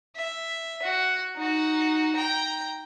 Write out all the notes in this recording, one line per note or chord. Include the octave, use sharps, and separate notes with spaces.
E5
F#4
D#4 F#4
G5 A#5